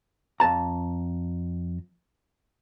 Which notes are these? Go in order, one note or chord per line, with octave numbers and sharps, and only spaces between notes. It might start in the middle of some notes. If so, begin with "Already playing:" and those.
F2 G#2 A5 A#5